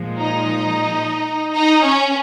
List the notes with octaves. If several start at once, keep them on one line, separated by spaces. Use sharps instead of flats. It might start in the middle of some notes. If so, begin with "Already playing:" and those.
Already playing: A#2 F3 G#3
D#4
D#4
C#4